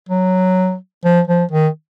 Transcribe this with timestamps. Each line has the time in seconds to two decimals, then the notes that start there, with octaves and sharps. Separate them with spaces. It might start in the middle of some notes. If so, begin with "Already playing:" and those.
0.09 F#3
1.04 F3
1.27 F3
1.52 D#3